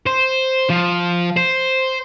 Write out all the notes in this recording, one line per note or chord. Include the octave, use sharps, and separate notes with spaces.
C5
F3
C5